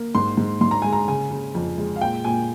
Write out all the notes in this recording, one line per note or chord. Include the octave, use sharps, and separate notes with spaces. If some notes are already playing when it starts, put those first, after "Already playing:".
Already playing: A#3
G#2 C6
G#2
G#2 C6
A#5
G#3 G#5
A#5
C#3 G#5
C#3
F2
G#3
F5
A#2 G5
A#2 G#5